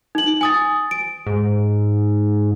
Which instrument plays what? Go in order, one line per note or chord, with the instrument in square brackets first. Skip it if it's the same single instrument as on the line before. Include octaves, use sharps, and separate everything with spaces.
[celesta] D#4 F#7
G#5 D#6 A6
D7
[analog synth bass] G#2